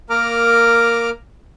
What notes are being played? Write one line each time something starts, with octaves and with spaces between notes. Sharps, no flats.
A#3 A#4 A#5 D6 F6